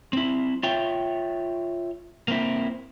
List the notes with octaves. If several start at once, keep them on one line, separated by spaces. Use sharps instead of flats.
C4 E4
F4 C#5 E5 G5
A#3 C4 E4